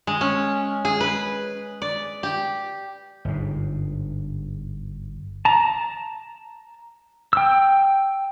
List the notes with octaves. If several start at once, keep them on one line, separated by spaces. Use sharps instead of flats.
G#3
C#4
G#4
B4
D5
G4
G1 G#2
A5 A#5
G5 E6